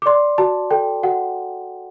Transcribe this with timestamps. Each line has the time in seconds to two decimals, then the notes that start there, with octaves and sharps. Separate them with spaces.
0.02 D6
0.06 D5 C6
0.38 F#4 A5
0.71 A4 G5
1.03 F#4 F#5